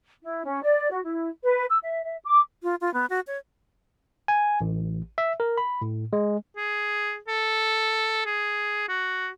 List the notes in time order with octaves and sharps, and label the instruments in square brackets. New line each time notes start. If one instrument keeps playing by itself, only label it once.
[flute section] E4
C#4
D5
F#4
E4
B4
E6
E5
E5
D6
[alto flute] F4
F4
B3
F#4
C#5
[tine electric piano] G#5
A1
E5
A#4
B5
A2
G#3
[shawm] G#4
A4
G#4
F#4